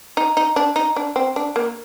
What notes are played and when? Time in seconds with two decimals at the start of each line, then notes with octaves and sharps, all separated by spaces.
0.17 D#4
0.37 D#4
0.56 D4
0.76 D#4
0.96 D4
1.16 C4
1.36 D4
1.56 A#3